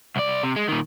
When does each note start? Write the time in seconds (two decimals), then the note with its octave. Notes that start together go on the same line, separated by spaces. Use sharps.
0.16 C2 D5
0.43 C3
0.56 G#3
0.69 A#2 D#3